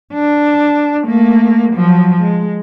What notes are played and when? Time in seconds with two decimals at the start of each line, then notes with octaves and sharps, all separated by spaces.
0.13 D4
1.06 A3 A#3
1.73 F3 F#3
2.22 G#3